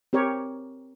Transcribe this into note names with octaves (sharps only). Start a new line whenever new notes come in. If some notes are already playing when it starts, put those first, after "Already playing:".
C4 G4 A#4 C#5